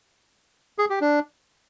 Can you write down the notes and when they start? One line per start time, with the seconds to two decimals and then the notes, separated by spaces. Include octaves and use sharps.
0.78 G#4
0.90 G4
1.01 D4